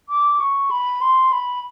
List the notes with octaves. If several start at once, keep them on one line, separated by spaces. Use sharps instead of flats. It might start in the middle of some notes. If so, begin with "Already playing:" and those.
D6
C#6
B5
C6
B5